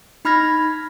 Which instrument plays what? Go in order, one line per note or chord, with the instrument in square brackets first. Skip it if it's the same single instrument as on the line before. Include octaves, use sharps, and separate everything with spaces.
[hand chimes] D#4 B5 F6 G#6 A#6